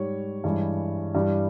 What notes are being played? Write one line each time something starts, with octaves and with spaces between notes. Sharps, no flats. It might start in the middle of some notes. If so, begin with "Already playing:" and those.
Already playing: G#2 G3 C#5
G2 E3 G#3
G2 E3 G3